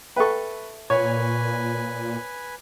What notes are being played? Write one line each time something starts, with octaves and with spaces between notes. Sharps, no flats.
A4 B4 E5 G5 C#6
A#2 B4 C#5 G#5